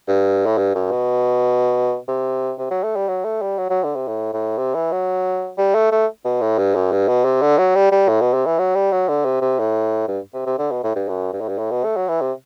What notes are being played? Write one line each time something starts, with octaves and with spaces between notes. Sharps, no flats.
G2
A2
G2
F#2
B2
C3
C3
F#3
A3
G3
F#3
A3
G3
F#3
F#3
D3
C3
A2
A2
C3
E3
F#3
G3
A3
A3
B2
A2
G2
F#2
G2
B2
C3
D3
F#3
G3
G3
A2
B2
C3
E3
F#3
G3
F#3
D3
C3
C3
A2
G2
C3
C3
D3
B2
A2
G2
F#2
G2
A2
G2
A2
B2
A3
F#3
E3
C3